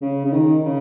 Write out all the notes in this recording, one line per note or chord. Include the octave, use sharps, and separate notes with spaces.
C#3
C#3
D#3
C#3